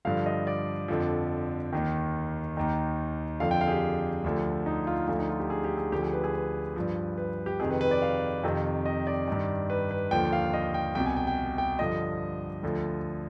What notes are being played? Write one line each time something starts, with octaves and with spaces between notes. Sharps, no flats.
G2 D3 F3 F5
D#5
D5
F2 D3 F3
D#2 D#3
D#2 D#3
F2 D3 F3 F5
G5
F5
G#4
G4
D2 D3 F3
D#4
F4
D2 D3 F3 F4
D#4
F4
G4
G#4
G4
G#4
D2 D3 F3 G4
G#4
B4
G#4
B4
G2 F3
B4
G4
F2 C3 D#3 G#4
B4
B4
D5
F5
F2 C3 D#3
D#5
D5
G2 D#3
B4
B4
D#2 D3 F3 G5
F5
D#5
G5
C2 B2 G5
G#5
G5
G5
G5
G2 D3 F3 D#5
D2 D3 F3